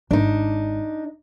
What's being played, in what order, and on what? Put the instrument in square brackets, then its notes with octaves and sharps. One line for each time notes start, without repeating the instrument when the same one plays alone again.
[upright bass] G#1 [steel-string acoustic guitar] D4 D#4